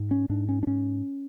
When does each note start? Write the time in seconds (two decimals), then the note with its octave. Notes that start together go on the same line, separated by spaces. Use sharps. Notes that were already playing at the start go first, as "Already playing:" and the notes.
Already playing: G#2
0.11 C#4
0.29 G#2 D4
0.49 C#4
0.63 D4
0.67 G#2 C#4